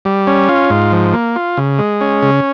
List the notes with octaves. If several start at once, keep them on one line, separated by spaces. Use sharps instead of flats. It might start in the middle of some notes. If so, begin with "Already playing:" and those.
G3
C#4
F4
G#2
F3
A#3
F4
C#3
G#3
C#4
C#3